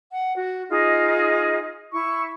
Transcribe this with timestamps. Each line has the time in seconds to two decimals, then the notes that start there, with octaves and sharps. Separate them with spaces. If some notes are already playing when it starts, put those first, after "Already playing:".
0.10 F#5
0.34 F#4
0.69 D#4 F4 G#4 D#5
1.91 E4 C#6